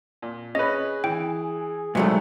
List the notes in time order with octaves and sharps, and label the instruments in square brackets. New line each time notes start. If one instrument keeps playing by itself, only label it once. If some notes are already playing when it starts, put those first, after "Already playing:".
[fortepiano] A#2
[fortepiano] C#4 B4 [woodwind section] G#4 [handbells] D#5
[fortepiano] E3 [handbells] G5
[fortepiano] C2 C3 G3 [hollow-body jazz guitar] G#2 F#3 A3 [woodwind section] A#3 C#4